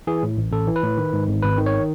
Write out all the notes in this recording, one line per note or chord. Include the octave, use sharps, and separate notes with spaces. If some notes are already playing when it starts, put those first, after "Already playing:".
E3 G#4
A2
A1
A1 A4
E3
B4
A2
D#3
G#2
G#1
G#1 B4
D#3
C#5